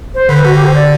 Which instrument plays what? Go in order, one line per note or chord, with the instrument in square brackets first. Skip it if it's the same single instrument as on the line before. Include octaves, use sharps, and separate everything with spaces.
[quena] C5
[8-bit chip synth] D3 [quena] B4
[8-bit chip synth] D3 [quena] F#4
[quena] G4
C5
D5